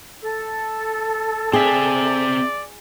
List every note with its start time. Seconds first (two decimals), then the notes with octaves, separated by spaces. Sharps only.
0.20 A4
1.53 C4 G#4 D5 E5